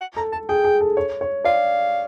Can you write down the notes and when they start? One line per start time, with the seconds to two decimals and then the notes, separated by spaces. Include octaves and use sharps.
0.01 F#5
0.16 A4 A#5
0.32 A4 A5
0.49 G#4 G5
0.64 G#4
0.81 A4
0.97 C#5
1.21 C#5
1.45 D5 F5